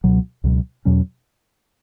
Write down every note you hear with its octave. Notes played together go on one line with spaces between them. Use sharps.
C#2 B2 F#3
C#2 B2 F#3
E2 B2 F#3 C#4